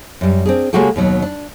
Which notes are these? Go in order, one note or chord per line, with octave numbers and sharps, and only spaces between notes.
F#2 G3
C4 D4 G#4
C#3 G#3 A#3 F#4 G4 A4
D#2 B2 F#3
D4